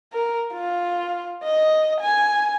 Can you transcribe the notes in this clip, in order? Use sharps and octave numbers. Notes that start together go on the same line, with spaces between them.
A#4
F4
D#5
G#5